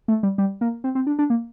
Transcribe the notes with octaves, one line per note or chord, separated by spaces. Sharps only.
A3
G3
G3
A#3
C4
C4
D4
D4
A#3